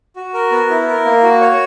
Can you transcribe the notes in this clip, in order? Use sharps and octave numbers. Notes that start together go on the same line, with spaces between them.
F#4
A#4
B3
E4
A#4
A#3
F#4
C#5